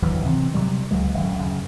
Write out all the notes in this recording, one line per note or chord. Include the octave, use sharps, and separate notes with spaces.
D1 D2 E3 F#3
C3 E3 C4
C3 D#3 F#3 G3
C#2 F#3 G#3
D1 F#2
F#2 C#3